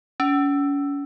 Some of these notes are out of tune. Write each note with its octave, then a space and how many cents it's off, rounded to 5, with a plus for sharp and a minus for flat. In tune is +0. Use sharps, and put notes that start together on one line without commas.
C#4 +35